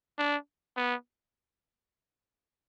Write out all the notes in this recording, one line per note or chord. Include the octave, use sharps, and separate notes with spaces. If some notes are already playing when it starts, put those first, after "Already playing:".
D4
B3